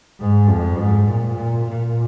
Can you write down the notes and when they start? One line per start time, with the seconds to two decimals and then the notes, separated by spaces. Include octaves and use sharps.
0.20 G#2
0.49 F2
0.78 G#2
1.08 A#2
1.36 A#2
1.66 A#2